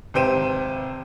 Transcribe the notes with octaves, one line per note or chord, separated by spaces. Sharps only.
G#1 C3 C5 G5 D#7 E7